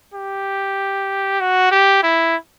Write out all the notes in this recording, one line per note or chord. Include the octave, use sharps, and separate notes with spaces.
G4
F#4
G4
E4